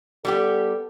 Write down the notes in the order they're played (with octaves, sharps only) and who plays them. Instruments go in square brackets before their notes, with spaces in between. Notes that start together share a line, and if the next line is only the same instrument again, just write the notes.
[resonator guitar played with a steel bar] G3 B3 G4 [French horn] A4